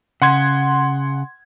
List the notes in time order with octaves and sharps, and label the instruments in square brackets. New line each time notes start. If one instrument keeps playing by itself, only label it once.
[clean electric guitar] C#3 [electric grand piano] F#5 C6 G#6